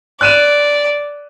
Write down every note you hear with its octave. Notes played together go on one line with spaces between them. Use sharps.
D5 F#6 D#7 E7